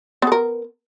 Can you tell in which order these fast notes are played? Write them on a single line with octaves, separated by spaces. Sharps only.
B3 A4 A#4